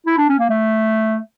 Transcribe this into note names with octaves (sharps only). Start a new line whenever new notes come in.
E4
D4
C#4
A#3
A3